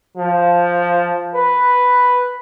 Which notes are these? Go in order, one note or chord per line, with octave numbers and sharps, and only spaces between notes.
F3
B4